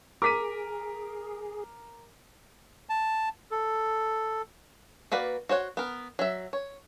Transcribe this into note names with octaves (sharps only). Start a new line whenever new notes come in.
G#4 A#4 D6 B6 D#7
A5
A4
A#3 F#4 B4 D5 F#5
F#4 C5 C#5 F#5
B3 A#4
F#3 E5
C#5